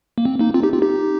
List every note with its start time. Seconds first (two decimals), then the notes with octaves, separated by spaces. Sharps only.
0.18 A#3
0.25 C4
0.39 A#3 D#4
0.54 C4 F4
0.63 D#4 G4
0.73 C4 F4
0.82 D#4 G4